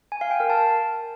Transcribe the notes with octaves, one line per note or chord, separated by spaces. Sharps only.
G#5
F5
G5
A#4
A5